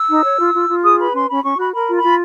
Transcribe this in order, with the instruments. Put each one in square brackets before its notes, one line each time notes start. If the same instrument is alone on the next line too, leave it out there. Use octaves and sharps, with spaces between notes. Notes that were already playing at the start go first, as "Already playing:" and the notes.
Already playing: [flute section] E6
D#4
C#5
F4
F4
F4
G#4 D#6
B4 B5
C#4 C6
C#4 B5
C#4 C#6
F#4 B5
A#4 B5
F4
B5
F4